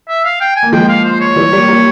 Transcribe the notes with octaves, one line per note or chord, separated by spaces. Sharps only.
E5
F5
G5
G#5
A#3
F3 G#3 G5
F5
C5
C#5
E3 G3
G3 A#3
G3 A#3